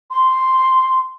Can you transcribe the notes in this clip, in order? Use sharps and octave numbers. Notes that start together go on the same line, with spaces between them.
C6